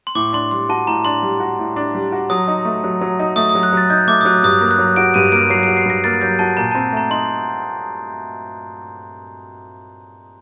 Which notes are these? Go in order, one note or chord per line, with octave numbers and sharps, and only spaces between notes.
C6
A2 D6
D4 C6
G3 C6
F#4 A5
A2 A#5
D4 C6
G3
F#4
A2
D4
G3
F#4
F#3 D#6
D#4
A3
F#3
F#3
D#4
A3 D#6
D#6
F#3
F#6
F#3 A6
D#4 G6
A3 D6
D#6
F#3 F#6
G2 D#6
A#3
F#6
F#3
F#4 D7
G2 D#7
A#3 D7
F#3 C7
D7
F#4
C7
G2 A#6
A#3 A6
F#3 G6
F#4 A5
A#2 A#5
A5
C4
A3 A#5
D#4 C6